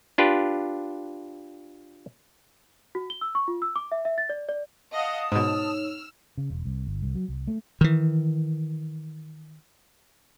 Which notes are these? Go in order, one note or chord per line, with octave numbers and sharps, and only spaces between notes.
D4 F4 G4 B4
F#4
G7
E6
C#6
F4
E6
D6
E5
E5
A6
D5
D5
D#5 F5 F#5 A5 D#6
G#2 B2 D#4 C#5 E6 F6
C#3
E1
C2
G1
C2
F#3
C2
A3
D#3 E3